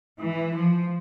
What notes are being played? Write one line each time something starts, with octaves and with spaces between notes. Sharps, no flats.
E3
F3